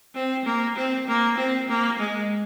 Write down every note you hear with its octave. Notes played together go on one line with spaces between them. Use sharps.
C4
A#3
C4
A#3
C4
A#3
G#3